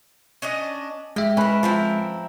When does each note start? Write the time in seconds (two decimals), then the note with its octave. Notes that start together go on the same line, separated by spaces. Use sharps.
0.42 C#4 D4 D#5
1.16 G#3 G4 E5
1.37 C#4 E4 A#4 B4
1.63 F3 C4 E4 A#4